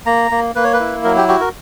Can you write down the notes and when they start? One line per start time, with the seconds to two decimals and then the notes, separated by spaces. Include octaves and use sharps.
0.06 A#3 A#5
0.31 A#3
0.55 A#3 B4
0.64 C#5
0.73 B4
0.80 E4
1.04 F#3 A#4
1.16 G4
1.28 F#4 G4
1.41 A#4